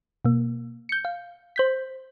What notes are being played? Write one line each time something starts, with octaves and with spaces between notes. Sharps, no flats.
B2 A#3
G6 C#7
F5
C5 G6 B6